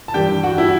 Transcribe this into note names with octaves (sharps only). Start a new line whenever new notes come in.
A5
G2 E3 G3 G4 G5
F#4 F#5
E4 E5